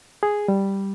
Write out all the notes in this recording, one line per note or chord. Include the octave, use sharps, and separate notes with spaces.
G#4
G3